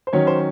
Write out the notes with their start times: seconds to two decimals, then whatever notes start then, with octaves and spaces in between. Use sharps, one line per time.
0.07 C5
0.13 D#3 F#3 C#4 C#5
0.27 C5